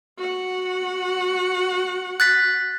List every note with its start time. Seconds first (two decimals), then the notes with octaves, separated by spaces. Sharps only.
0.18 F#4 F#5
2.20 F#6 A6 B6